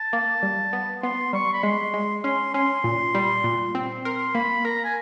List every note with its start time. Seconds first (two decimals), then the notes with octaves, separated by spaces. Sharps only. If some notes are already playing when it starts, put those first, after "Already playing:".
Already playing: A5
0.13 A#3
0.43 G3
0.73 B3
1.03 B3 C6
1.33 G3 C#6
1.53 B5
1.63 G#3 C6
1.94 G#3
2.24 C#4 C6
2.54 C#4 C6
2.84 A#2
3.15 G3
3.44 A#2
3.75 C4
4.05 A#4 C6
4.35 A#3 B5
4.65 A#4 A#5
4.84 G#5